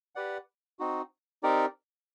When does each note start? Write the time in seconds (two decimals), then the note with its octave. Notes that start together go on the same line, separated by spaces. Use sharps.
0.15 G4 B4 D5 F#5
0.79 C4 D#4 F#4
1.43 C4 D#4 G4 A#4 D5